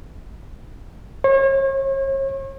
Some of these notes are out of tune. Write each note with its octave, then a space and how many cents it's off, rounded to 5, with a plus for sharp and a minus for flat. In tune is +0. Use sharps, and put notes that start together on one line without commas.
C#5 -40